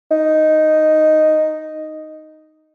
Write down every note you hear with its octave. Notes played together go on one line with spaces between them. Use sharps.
D#4